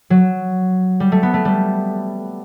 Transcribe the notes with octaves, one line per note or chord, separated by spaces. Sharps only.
F#3
G3
A3
B3
A3
G3